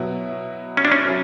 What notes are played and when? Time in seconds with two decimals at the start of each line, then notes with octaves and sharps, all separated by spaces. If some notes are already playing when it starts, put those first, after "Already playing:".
Already playing: B2 F#3 B3 E4
0.77 C#4
0.85 D4
0.92 C#4
1.06 F#3 C#4 E4